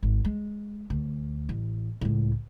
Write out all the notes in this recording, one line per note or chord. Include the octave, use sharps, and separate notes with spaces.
G#1
G#3
D2
A1
C#2 A2